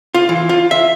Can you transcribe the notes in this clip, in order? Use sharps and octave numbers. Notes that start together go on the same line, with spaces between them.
F4
E3
F4
E5